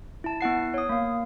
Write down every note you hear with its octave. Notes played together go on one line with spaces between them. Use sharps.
E4 A5
B3 E4 F#5 C7
C#5 D#6
A#3 F5